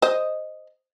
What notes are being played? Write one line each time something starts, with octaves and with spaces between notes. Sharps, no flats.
C5 D#5